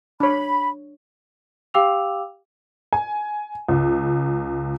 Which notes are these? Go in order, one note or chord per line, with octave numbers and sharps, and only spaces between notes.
D4 C#5 B5
G4 F5 G5 D6 E6 F7
G#5
C#2